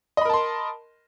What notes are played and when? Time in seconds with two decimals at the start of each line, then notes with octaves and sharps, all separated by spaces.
0.17 D#5
0.21 B5
0.25 A#4
0.29 A5
0.33 C6